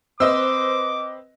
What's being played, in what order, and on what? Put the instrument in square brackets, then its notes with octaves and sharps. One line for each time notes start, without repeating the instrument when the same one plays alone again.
[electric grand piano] C4 B4 [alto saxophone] C5 [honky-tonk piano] D#5 E6 [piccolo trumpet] D6